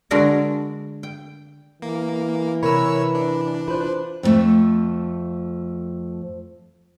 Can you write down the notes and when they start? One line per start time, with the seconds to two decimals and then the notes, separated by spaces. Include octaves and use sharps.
0.11 D3 G#3 D4 F#4 A#4 D5
1.03 G5
1.82 E3 A#3
2.63 C3 A#4 B4 C#5 B5 E6
3.15 D4
3.68 F4 B4 C5
4.23 F2 B2 F3 A3 E5